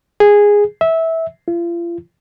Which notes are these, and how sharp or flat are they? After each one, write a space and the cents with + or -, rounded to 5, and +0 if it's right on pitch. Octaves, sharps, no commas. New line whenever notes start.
G#4 -10
E5 -15
F4 -40